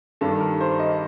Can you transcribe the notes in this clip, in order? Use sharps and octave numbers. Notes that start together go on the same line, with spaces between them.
G2 D#3 G3 D4 A4
A#4
C5
D#5